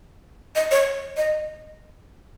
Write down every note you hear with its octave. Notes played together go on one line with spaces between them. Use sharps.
D#5
C#5
D#5